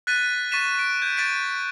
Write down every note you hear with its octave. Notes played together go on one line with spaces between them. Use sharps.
F#6 A6 B6 D#7
C#6 A6 B6 D#7 E7
D7
G6 G#6
G6 A6 B6 D7 D#7